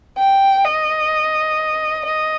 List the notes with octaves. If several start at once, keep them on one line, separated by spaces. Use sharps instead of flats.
G5
D#5
D#5